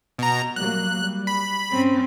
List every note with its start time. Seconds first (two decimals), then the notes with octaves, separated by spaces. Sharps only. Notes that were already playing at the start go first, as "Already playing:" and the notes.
0.19 B2 A#5
0.56 F#3 G3 A#3 F#6
0.97 G3
1.27 B5
1.71 G2 C4 C#4